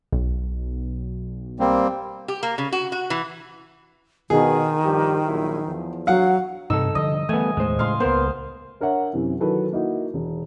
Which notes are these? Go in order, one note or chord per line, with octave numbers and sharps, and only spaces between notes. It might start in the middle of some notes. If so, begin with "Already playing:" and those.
B1
G3 A#3 C4
G4
A#3
C#3
F#4
F#4
E3
B2 D#3 G#4
G2 F3 G4
A#1 F#3 E4
E2 F3
F#3 F5 F#5
G2 C3 D#4 A4 E6
D3 F3 G3 D#5
E3 G3 A3 B3 G#5
D#2 A2 G#3 A3 C5
A2 C#3 F5 C6
C#2 A#3 B3 A#4 C5
D4 A#4 C#5 E5 F#5
F#2 C3 E3
D#3 E3 F#3 A4 B4
A#3 D#4 E4 F#4
E1